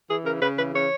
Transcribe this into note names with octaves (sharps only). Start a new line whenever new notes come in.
E3 G#4
C#3 A#4
C#3 B4
E3 B4
C#3 C#5